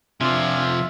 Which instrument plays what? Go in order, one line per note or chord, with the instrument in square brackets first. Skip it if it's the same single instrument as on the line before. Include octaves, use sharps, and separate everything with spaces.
[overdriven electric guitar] C3 F3 [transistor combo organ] D4 F5 G#5 [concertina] F4 E5